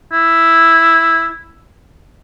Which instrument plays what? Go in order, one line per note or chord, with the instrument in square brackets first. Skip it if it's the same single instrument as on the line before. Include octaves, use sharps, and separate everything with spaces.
[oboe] E4